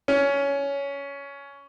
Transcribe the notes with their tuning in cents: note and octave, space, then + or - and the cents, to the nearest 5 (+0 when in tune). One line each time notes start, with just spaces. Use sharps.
C#4 +15